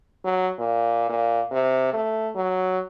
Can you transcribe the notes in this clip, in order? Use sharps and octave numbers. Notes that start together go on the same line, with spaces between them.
F#3
A#2
A#2
C3
A3
F#3